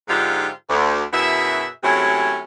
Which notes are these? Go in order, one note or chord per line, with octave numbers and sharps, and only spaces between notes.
G#2 D3 F3 D#4 F4 G4
D2
F#2 B2 E4 G#4 E5
C3 F#3 G#3 A3 C#4 E4